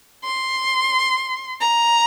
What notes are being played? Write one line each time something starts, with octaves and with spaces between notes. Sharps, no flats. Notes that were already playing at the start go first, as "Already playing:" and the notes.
C6
A#5